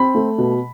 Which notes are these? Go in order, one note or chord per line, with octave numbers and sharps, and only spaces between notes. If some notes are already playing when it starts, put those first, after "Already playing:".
Already playing: C4 B5
A3
B2